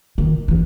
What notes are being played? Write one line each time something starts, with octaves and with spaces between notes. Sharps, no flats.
D#3
E3